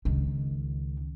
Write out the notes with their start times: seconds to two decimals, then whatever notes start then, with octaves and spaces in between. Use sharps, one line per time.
0.05 C#2 D#3